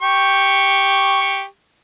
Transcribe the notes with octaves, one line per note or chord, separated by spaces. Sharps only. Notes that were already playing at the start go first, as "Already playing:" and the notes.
G4 C#6